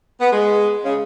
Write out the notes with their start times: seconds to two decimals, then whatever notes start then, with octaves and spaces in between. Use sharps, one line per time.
0.20 B3
0.32 G#3
0.84 C#3